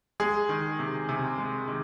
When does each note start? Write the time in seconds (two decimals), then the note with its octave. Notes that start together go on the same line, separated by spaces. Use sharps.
0.20 G#3 G#4
0.49 D#3
0.79 C3
1.09 C3
1.38 G#3
1.68 D#3